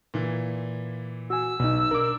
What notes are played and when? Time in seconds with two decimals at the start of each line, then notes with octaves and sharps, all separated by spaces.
0.14 A#2 E3
1.30 F#4 G#5 E6
1.60 B1 B2 D#4
1.91 D4 A#4 D6